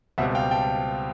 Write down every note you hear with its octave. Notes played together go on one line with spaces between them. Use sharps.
C#2 B2 G3 C4 E5 F#5
F5 G5
G5 A5